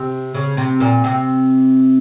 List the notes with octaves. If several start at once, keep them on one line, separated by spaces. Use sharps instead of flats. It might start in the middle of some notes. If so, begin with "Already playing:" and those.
Already playing: C3
C#3
C3
A#2
C3